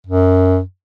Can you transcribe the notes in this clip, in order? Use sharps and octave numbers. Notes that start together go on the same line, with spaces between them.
F#2